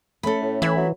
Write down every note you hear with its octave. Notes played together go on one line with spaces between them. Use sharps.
A3 C#4 A4 B5
A2
E3 E4 B5
F#3